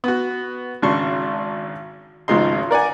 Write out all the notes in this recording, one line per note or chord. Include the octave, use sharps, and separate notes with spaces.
B3 F#4
G#1 C#3 D4 A5 C6 C#6
G#1 C#2 F3 G#3 D#4 C6
A#4 D5 F#5 G#5